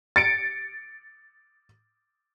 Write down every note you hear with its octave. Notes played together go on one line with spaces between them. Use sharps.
A6 C#7 D7